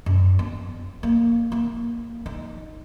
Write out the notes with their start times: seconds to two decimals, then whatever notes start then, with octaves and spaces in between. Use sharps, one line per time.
0.06 F#2
0.39 B3
1.03 A#3
1.52 A#3
2.26 D#4